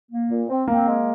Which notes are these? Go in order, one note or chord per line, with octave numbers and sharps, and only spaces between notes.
A#3
A#2
C4
A#3 C4
G#3